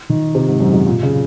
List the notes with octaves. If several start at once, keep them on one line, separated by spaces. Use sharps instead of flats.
D#3
C3
G#2
F#2
F#2
A#2
C#3